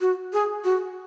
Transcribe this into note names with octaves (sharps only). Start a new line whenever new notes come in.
F#4
G#4
F#4